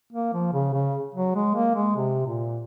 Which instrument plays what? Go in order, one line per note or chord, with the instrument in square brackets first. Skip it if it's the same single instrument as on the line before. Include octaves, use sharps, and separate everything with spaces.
[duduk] A#3
F3
C#3
C#3
F#3
G#3
A#3
G#3
C3
A#2